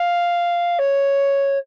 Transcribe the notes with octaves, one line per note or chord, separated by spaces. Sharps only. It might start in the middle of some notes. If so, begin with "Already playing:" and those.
Already playing: F5
C#5